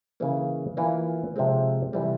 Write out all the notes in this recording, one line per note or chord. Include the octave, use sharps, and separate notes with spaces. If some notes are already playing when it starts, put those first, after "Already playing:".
C#3 E3 A#3
E3 A#3 F4
C3 F3 G#3 C4
C3 E3 G3